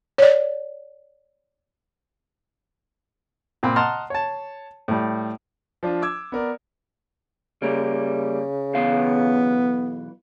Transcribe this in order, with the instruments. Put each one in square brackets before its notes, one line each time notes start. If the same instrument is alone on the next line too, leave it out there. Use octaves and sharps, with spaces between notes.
[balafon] C#5 D5
[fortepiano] A#2 C4 B5
D#5 F#5 A5 A#5 C6 F6
C#5 A5
A2 G3
[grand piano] F3 D4 F4
D6 E6 G#6
B3 A#4 D5
[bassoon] C#3 [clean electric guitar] G3 A#3
[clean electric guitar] B1 E3 F5 [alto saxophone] B3